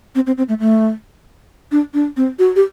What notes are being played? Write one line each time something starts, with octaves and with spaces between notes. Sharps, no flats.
C4
C4
C4
A3
A3
D4
D4
C4
F#4
G4